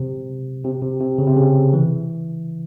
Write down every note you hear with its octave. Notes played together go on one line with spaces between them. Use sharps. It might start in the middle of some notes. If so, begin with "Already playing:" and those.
Already playing: C3
C3
C3
C3
C#3
C3
C#3
E3